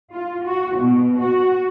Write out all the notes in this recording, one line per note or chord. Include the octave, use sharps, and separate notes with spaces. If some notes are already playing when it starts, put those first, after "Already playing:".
F4
F#4
B2
F#4